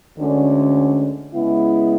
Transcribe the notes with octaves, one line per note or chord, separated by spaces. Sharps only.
D2 D3 G#3 C#4
C#3 G#3 B3 E4